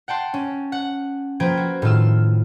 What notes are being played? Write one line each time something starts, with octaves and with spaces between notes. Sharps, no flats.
F#5 G5 A5 C6
C#4
F#5
F3 A#3 B4 G5 G#6
F#4
A2 D#3 F4 E6